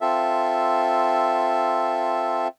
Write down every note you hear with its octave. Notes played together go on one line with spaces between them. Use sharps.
C4 F4 A4 E5